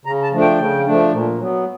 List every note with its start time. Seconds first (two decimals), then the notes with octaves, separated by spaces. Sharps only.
0.05 C#3 A#5
0.23 A5
0.32 F3 A3 D4
0.41 G5
0.58 C#3
0.86 F3 A3 D4
1.12 A#2
1.39 F#3 B3